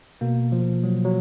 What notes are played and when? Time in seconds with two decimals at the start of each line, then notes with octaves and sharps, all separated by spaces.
0.21 B2 A#3
0.52 F3
0.84 F#3
1.05 F#3